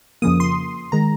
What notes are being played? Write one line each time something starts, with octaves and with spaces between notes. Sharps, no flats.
F2 C#3 F3 A#3 D#6
C6
D#3 G#3 A#5